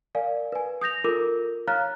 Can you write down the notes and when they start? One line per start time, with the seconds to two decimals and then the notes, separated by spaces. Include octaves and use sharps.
0.15 A#4 D5 F5 G#5
0.52 B4 G#5
0.81 D#6 G6 A#6 F7
1.04 F4 A4 A#4 D6
1.67 C#5 F5 A#5 F6 F#6 A6